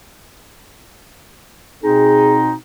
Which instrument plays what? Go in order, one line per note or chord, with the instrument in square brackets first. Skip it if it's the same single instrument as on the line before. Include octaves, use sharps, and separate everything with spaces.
[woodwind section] B2 C4 D#4 [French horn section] G#4